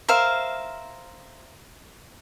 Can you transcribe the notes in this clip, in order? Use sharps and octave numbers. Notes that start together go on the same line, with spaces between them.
A#4 C5 E5 F5